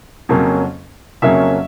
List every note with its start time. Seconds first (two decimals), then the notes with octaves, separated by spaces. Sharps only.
0.29 F2 C#3 F#3 A#3 C#4
1.22 F2 C#3 F#3 A#3 C#4 E5